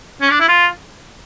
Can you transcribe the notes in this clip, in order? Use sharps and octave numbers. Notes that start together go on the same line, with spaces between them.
C#4
D4
E4
F4